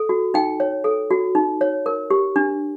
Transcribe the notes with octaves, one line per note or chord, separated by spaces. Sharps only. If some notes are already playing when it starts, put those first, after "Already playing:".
Already playing: A4
F#4
D#4 G5
C#5
A4
F#4
D#4
C#5
A#4
G4
D4